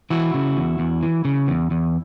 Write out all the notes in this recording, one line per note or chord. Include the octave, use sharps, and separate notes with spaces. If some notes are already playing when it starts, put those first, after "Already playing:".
E3 E4 F#4
C#3
E2
E2
E3
C#3
E2
E2